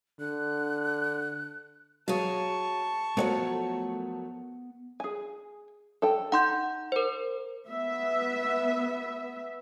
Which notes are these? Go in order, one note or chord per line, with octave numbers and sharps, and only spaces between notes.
D3 F#6
F#3 G#4 C#5 F5 A5 C#6
F3 F#3 A3 B3 A#4 C#5 F#5
G#4 G#5
A4 G5
D#4 F#5 C6 G6
A#4 C5
B3 E5